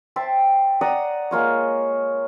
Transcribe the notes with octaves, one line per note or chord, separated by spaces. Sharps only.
C5 E5 G5 A5
D5 F#5 A#5 D#6
G#3 A#3 F4 C#5